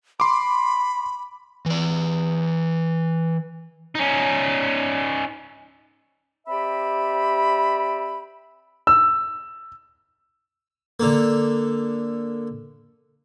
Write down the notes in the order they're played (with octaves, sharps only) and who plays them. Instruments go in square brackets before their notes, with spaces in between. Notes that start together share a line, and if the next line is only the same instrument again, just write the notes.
[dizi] B5 [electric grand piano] C6 D6
[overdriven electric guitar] E3 D5
[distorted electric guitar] C#4 D#4
[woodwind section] C4 G4 D5 E5 B5
[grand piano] E6
[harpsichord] D3 A#3